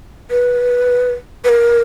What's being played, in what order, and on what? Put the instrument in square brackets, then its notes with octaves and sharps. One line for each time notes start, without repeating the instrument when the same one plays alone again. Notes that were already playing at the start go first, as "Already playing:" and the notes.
[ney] B4
B4
A#4